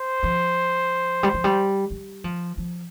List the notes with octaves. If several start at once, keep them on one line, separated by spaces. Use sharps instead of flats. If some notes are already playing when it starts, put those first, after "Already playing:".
Already playing: C5
F3
G3
F3
G3
G3
F3
F3